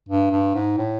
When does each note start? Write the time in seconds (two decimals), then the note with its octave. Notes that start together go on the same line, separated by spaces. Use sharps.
0.09 G2
0.31 G2
0.55 G#2
0.78 A2